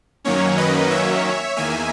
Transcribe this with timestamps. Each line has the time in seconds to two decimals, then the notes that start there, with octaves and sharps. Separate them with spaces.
0.24 F#2 D#3 F#3 A#3 C#4 C#5
0.57 B4 D#5
0.90 C#5 E5
1.56 E2 D#3 A#3 E5 G#5